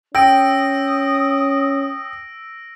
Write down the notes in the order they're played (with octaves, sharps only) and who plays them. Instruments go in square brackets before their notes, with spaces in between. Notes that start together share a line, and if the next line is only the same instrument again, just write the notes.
[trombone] C#4 [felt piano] G5 [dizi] D#6 [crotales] E6 A#6 D7